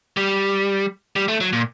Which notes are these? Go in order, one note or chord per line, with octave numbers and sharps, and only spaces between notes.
G3
G3
A3
F#3
A#2